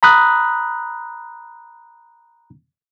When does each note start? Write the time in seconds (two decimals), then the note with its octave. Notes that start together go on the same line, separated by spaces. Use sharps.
0.03 A#5 B5 D#6 F#6